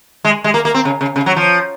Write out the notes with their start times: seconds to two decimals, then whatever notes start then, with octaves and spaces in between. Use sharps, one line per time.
0.25 G#3
0.44 G#3
0.54 A#3
0.65 A#3
0.74 C4
0.85 C#3
1.01 C#3
1.16 C#3
1.26 F#3
1.36 F3